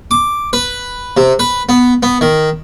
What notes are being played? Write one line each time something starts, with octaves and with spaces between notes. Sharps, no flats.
D6
B4
C3
B4
B3
B3
D#3